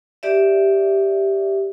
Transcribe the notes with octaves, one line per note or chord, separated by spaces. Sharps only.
G4 D5 E5